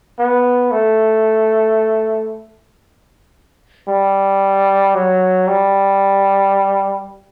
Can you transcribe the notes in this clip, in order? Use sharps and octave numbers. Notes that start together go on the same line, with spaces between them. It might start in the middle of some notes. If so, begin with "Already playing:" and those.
B3
A3
G3
F#3
G3